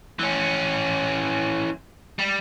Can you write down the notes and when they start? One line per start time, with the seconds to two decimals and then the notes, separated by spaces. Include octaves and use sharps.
0.19 E3 C#4
2.19 G3